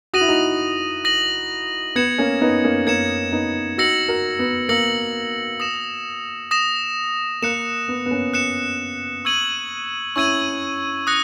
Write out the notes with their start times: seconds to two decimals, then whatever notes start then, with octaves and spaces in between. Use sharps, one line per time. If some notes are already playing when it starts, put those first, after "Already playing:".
0.13 F#4 D#6 A#6 D#7 F#7
0.21 E4
0.28 D#4 F#4
1.05 D#6 A#6 D#7 F#7
1.95 B3 G#6 C#7 E7
2.18 A#3 C#4
2.41 B3 D#4
2.64 A#3 C#4
2.87 A#3 C#4 G#6 C#7 E7
3.32 B3 D#4
3.78 D#4 F#4 E6 A#6 C#7 F#7
4.08 F#4 A#4
4.39 B3
4.69 A#3 E6 A#6 C#7 F#7
5.60 D#6 A#6 E7
6.51 D#6 A#6 E7
7.42 A#3 F#6 C#7 E7
7.88 B3
8.06 B3
8.11 A#3 C#4
8.34 F#6 C#7 E7
9.25 C#6 E6 G#6 D#7 F#7
10.16 C#4 E4 C#6 E6 G#6 D#7 F#7
11.07 D#6 F#6 A#6 C#7